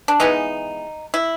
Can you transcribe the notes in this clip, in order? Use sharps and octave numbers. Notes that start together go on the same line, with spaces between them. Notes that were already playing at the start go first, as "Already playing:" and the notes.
D4
E3 G#3 B3 D#4
E4